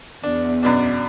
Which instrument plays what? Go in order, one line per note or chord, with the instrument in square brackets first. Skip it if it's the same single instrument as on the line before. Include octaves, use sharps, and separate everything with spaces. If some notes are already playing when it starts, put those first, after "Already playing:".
[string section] E2 [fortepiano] D4
[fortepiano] F#2 B2 D4